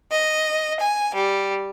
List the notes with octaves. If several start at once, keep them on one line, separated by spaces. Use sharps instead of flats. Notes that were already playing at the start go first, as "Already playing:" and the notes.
D#5
G#5
G3